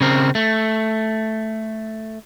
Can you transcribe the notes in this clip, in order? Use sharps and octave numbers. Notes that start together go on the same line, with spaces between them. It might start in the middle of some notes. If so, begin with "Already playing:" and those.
C#3 C4 A#4
A3